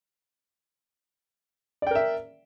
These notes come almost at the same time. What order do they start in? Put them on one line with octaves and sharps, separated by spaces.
D5 G5 A#4 E5